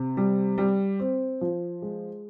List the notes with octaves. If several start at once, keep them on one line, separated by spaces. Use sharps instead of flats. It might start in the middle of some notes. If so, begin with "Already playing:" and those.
Already playing: C3
G3
G3
C4
F3
G#3